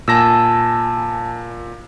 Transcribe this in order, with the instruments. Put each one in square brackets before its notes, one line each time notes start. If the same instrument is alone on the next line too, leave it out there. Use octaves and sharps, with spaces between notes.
[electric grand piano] A#2 A#6 [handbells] G#5 A5 E6